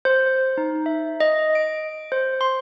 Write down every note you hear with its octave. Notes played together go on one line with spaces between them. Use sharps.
C5
D#4
E5
D#5
D7
C5
C6